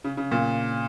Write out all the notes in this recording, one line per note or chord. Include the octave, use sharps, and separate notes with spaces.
C#3
C#3
A#2